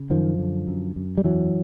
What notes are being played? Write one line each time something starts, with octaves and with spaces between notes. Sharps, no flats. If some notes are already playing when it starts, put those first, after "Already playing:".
Already playing: C#3
F#2 D#3 F3
D3
F#2
F#2
G3
E2 E3 F#3